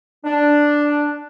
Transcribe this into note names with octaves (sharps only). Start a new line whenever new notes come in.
D4